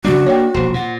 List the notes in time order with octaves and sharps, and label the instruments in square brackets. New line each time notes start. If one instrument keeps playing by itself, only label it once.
[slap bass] C#3 F#3 G3 [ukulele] D4 [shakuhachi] F#4
[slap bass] A#3 [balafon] C#5 G5
[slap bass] E1 A#1 [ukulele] C5
[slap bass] A#2 [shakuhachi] F#5